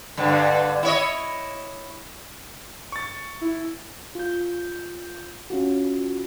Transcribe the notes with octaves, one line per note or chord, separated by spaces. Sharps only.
G2 D3
E4 C#5 D#5
C#6 A6
E4
F4 G6
C#4 F4 F#4